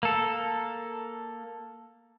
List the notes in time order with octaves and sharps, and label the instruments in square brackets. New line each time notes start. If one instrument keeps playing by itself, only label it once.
[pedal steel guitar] A#3 A4